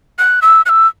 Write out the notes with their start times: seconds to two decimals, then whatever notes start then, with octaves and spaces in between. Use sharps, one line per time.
0.19 F#6
0.42 E6
0.66 F#6
0.69 E6